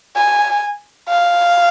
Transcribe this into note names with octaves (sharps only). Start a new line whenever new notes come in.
G#5
F5